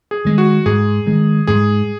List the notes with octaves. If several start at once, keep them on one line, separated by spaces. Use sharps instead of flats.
G#4
D#3 G#3
F#4
G#2 G#4
D#3 G#3
G#2 G#4